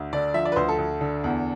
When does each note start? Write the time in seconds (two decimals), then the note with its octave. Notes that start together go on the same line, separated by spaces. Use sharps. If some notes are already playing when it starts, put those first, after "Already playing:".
Already playing: D2
0.13 D3 D5
0.34 F3 E5
0.45 D5
0.52 B4
0.56 D2 C5
0.68 A4
0.78 D2
1.01 D3
1.24 E2